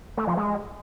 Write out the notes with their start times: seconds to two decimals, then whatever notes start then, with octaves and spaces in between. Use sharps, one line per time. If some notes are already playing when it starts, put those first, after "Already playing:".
0.17 A3
0.27 F3
0.37 G#3